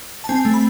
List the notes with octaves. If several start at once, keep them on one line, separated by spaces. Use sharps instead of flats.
A5
C4 G#5
A3
B5